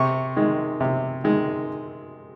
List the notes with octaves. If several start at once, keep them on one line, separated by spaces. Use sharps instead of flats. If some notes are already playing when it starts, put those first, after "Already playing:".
Already playing: C3 C#6
D#3 G#3
C3
D#3 G#3